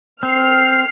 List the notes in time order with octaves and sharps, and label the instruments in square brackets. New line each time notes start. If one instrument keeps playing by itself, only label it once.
[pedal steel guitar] C4 [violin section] F6 C7